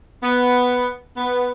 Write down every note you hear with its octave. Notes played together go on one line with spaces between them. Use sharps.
B3
B3